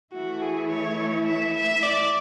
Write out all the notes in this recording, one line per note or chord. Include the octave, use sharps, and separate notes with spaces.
E3 A3 E4 F#4
G#4
C#5
E5
E5
D5